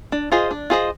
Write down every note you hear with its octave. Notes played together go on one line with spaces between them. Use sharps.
D4
F4 G#4 C5 D#5
D4
F4 G#4 C5 D#5